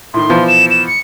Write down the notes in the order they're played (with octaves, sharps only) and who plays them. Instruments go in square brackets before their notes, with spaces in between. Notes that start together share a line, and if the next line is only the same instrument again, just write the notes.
[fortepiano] A2 D#3 [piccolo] C6
[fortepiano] B2 E3 F3
[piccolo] E7
E7
C#7